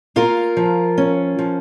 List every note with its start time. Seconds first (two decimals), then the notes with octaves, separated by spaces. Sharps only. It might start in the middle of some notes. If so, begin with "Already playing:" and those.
0.16 A#3 F4 A#4
0.57 F3
0.98 C#4
1.39 F3